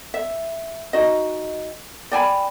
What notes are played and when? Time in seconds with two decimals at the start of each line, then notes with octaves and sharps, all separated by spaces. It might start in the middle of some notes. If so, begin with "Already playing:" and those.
0.14 E5
0.93 D#4 F#4 D#5
2.12 D5 G5 G#5 B5